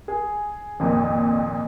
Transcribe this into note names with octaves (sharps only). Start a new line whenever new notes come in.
G#4
G#1 F2 A#2